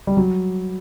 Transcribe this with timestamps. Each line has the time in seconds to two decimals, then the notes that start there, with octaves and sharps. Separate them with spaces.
0.07 G3
0.17 F#3